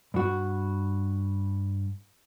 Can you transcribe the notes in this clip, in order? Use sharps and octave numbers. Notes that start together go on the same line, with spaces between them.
G2 F#4